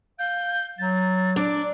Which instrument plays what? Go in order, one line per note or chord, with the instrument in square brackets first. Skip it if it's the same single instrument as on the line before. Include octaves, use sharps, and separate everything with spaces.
[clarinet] F5 [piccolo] G6
[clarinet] F#3 [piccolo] A6
[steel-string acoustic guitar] D4 [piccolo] D6